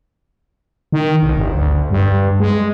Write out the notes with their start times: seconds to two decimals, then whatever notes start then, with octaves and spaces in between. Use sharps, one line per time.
0.92 D#3
1.23 B1
1.35 G1
1.55 D2
1.90 G2
2.40 G#3